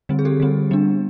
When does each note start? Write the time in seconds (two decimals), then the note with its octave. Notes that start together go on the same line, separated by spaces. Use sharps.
0.09 D3 G3 C4
0.19 G#4
0.25 G4 A4
0.40 D3 G3 C4
0.71 G3 B3 D4